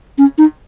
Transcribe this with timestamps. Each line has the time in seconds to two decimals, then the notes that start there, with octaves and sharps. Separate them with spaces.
0.18 C#4
0.38 D#4